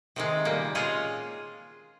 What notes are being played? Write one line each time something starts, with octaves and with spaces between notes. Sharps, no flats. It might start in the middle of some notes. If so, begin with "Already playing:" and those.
C3 D#3 G#3
A#2 G3 A#3
G#3 C#4 F4 G#4